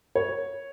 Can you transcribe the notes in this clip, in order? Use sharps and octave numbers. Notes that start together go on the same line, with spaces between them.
C#5